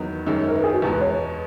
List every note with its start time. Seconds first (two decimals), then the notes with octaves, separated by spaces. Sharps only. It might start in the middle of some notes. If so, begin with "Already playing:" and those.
Already playing: E2 D#3 F#3 B3 D#4
0.27 F#2 D#3 G#3 C#4
0.48 A#4
0.54 B4
0.64 G#4
0.73 F#4
0.82 E2 B2 G#3 G#4
0.92 B4
1.01 C#5
1.10 B4